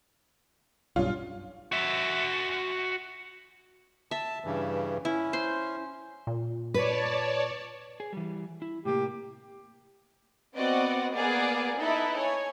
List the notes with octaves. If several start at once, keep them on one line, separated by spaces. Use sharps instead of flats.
B1 G2 C#4 F4
F#4 E5
E5 A5
G2 C#3 E3
C#4 E4
C5 C6
A#2
B4 C#5 D5 A5
G#4
E3 G3
E4
A2 C3 A#3 G4
B3 C4 F#4 D5 D#5 F#5
A#3 B3 G#4 D5 F#5
D#4 E4 A4 B4 E5
C#5 G#5